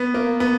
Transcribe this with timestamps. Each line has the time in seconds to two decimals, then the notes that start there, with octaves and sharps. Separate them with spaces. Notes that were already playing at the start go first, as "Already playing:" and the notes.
Already playing: B3
0.14 A#3
0.40 B3